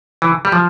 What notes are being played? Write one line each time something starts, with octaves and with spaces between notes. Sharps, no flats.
E3
G3
F3